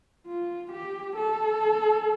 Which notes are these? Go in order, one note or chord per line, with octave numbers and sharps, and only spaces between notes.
F4
G4
A4